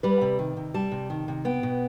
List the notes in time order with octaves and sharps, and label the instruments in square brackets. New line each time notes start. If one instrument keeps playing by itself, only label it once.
[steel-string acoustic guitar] G3 B4
C3
D#3
C3
G3 A5
C3
D#3
C3
B3 G5
B2